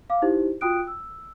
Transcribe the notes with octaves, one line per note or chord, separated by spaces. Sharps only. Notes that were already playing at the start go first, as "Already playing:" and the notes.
F5 D6
D#4 E4 G4 C5
F4 F#4 G5 D#6 F#6 D7
E6